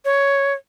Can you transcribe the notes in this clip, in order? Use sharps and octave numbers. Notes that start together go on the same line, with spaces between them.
C#5